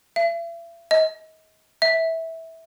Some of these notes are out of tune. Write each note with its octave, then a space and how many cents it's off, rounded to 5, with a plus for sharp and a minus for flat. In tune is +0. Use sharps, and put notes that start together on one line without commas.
E5 +40
D#5 +30
E5 -15